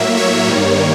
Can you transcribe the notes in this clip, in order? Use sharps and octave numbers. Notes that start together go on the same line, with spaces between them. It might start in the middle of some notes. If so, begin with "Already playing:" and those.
Already playing: A2 F#3 A#3 E5
C#5
G2 D#3 G3 A#3